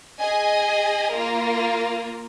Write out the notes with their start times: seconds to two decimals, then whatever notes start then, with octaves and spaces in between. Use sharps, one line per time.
0.19 G#4 D#5 G#5
1.12 A#3 F4 A#4